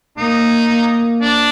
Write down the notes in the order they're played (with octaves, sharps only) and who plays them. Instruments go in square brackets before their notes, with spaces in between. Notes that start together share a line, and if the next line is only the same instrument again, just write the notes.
[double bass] A#3 [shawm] D#4
[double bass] A#3
[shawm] D4